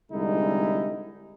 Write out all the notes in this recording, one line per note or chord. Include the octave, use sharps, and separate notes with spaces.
C2 D3 G3 G#3 D#4 E4